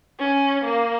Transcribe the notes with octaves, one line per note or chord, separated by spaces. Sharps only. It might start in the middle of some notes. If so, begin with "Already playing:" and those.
C#4
A#3